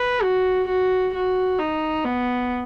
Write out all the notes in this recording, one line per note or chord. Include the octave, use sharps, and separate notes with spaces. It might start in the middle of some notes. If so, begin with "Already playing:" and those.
Already playing: B4
F#4
F#4
F#4
D#4
B3